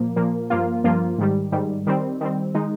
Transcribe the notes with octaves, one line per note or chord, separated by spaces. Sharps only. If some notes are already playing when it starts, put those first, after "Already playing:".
Already playing: A#2 F3 A#3
A#2 F3 A#3
G2 F3 A#3 F4
G2 F3 A#3 F4
G#2 D#3 G3
G#2 D#3 G3
D#3 G3 C4
D#3 G3 C4
D#3 G#3 D#4